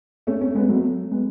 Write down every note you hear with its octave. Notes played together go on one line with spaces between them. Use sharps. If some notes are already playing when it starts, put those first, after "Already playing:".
A3 C#4
A3 C#4
G#3 B3
F#3 A3
G#3 B3